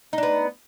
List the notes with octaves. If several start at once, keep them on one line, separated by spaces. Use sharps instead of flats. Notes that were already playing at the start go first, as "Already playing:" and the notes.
B3 D4 D#4